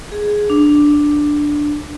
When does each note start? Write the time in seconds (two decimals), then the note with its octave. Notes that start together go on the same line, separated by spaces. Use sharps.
0.12 G#4
0.50 D4